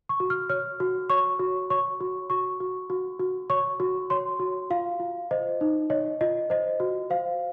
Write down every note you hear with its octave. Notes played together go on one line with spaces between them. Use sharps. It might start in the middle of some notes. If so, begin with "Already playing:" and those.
C#6
F#4
F6
C#5 F6
F#4
C#5 C#6
F#4
C#5 C#6
F#4
F#4 C#6
F#4
F#4
F#4
C#5 C#6
F#4
C#5 C6
F#4
F4 F5
F4
C5 D#5
D#4
C#5 D#5
F4 D#5
C5 D#5
F#4
C5 F5